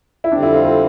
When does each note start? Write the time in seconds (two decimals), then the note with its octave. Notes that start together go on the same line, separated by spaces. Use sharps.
0.24 E4
0.32 F2 D3 G3 C4 D4
0.43 E4
0.54 F4
0.64 F4